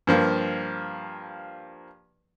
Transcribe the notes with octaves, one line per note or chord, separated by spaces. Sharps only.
G2 F3 A#3